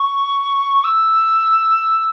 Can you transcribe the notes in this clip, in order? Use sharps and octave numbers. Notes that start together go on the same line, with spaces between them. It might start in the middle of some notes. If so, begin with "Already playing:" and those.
Already playing: C#6
E6